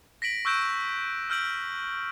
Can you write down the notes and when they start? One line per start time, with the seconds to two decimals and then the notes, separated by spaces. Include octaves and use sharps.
0.22 A#6 B6 D7 F#7
0.45 C#6 E6 F#6 G6 D7 E7
1.30 E6 F6 G6 D7 F#7